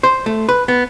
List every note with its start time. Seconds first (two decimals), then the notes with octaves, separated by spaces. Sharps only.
0.03 C5
0.26 A3
0.49 B4
0.68 B3